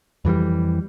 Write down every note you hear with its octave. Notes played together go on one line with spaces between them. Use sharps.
F2 E3 F#3 G3